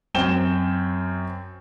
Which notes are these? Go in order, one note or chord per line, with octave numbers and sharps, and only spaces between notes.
F#2 C4 G5 E7 G7